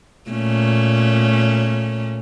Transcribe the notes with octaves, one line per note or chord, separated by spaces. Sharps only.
A#2 A3 C#4